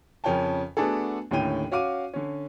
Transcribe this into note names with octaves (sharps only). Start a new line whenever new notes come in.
F2 C#3 C#4 A#4 G5 A5
A3 B3 D4 F#4 G#4 A4
D#2 A2 D3 C#4 G5 D#7
C#4 F#4 F5 D6 D#7
D3 C#4